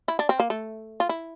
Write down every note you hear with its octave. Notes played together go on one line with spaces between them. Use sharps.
E4
D4
C4
A#3
A3
F4
E4